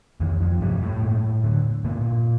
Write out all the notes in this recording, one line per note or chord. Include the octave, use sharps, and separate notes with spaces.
F2 D#3
F2 F3
G2 C3 G3
A2 A3
G2
D3
G2 A#2 A#3